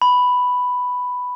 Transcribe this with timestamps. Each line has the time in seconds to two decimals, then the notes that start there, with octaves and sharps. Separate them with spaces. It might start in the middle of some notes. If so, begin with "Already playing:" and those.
0.02 B5